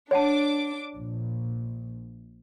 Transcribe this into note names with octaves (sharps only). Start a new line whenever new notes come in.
D4 C#5 F#5 A5 D6
A#1